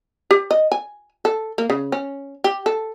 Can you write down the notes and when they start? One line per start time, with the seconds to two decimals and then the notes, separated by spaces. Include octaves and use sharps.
0.31 G4
0.51 D#5
0.72 G#5
1.25 A4
1.58 A#3
1.70 C#3
1.92 C#4
2.44 G4
2.66 A4